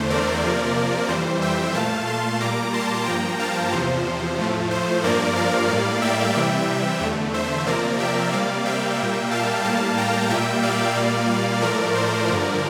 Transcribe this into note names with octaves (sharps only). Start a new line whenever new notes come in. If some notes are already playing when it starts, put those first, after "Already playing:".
Already playing: E2 D3 A3 C5
A#4 D5
C3 F3 A#3
F2 E3 G3 C5
E5 G5
A#2 A3 F5 A5
A5 C6
A#2 G3 A#3 A#5 D6
A5 C6
G2 F3 A#3 G5 A#5
F5 A5
E2 C3 F3 C5
A2 F3 A3
C5
G2 F3 A#3 A#4 D5
D5 F5
A2 G3 A#3
E5 G5
C3 E3 G3 E5 G5
E2 D3 A3
C5 E5
C3 F3 A#3 A#4 D5
E5 G5
C3 G3 A#3 D5 F5
E5 G5
A#2 G3 A#3
F5 A5
A2 G3 A#3 F5 A5
G5 A#5
A#2 G3 A#3 E5 G5
D5 F5
A#2 G3 A#3
A2 F3 A3 A#4 D5
C5
G2 D3 F3 A#4 D5